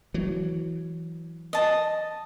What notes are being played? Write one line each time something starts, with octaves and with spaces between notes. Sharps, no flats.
E3 F#3
D#5 A5